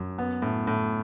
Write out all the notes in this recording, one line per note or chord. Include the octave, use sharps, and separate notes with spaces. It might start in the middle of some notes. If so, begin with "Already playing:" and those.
Already playing: F#2
B3
A2
A2